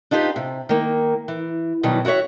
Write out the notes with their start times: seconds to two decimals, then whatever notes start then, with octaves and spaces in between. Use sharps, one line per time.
0.11 D4 D#4 F4 G4 B4
0.36 C3
0.69 D#3 A#3
1.28 E3
1.83 B2 D#3 F#3 G3
2.05 E4 F#4 A#4 C#5 E5